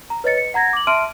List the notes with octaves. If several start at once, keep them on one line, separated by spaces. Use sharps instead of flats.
A#5
B4 C#5 D#5 A6 C#7
C#7
F#5 A#5 G#6 A#6
D6 F#7
E5 A5 C6 F6 D7 D#7